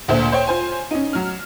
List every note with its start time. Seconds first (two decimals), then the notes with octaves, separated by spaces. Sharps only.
0.08 D2 A#2 C5 E5
0.32 C5 C#5 G5
0.47 F4 C5 G#5
0.91 C#4 D#4
1.13 F#3 F6